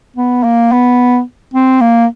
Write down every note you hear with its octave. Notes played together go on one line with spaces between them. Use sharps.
B3
A#3
B3
C4
A#3